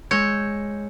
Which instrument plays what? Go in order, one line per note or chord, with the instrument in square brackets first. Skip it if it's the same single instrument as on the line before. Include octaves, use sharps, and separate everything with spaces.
[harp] G#3 E6 G6 [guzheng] C#5